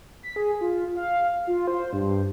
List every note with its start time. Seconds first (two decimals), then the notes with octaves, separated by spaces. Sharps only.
0.23 B6
0.36 G#4
0.61 F4
0.96 F5
1.47 F4
1.67 C5
1.93 G2